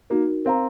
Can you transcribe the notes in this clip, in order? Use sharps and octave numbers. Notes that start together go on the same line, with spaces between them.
A#3 D#4 F#4 A#4
C4 A#4 F5 A#5